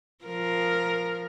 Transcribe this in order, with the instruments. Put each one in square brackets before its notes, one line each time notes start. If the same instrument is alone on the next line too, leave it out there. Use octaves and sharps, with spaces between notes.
[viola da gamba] F3 A#4